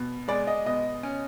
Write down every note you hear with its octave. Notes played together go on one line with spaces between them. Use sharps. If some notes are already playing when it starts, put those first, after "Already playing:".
Already playing: B2
G#3 D5
D#5
B2 D#5
C#4